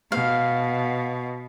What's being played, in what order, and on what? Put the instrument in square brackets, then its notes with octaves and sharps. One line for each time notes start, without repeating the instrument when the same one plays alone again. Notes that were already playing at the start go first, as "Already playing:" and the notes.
[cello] B2 [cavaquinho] F5